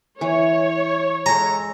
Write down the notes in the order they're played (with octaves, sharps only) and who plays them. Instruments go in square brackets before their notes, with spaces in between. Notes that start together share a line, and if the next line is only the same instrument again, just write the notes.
[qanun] E3 [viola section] C#5
[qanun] G#3 A4 [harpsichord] A#5